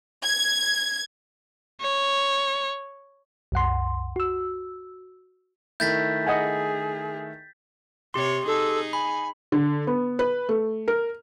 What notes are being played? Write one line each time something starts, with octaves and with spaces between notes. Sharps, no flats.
G#6
C#5
C2 F#2 F#5 C6
F#4 E6
D#3 A3 E4 G6 A6 B6
G#4 D#5 F#5 G#5
C3 G4 C#5 C6
D#4 G#4 A4
G#5 B5
D3
B3
B4
A3
A#4